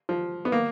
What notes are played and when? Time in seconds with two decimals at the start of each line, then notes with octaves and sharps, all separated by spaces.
0.09 F3
0.45 B3
0.52 A#3